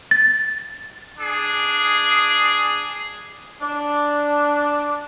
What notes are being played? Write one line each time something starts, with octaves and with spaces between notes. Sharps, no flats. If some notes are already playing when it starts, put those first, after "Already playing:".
A6
D4 G#4
D4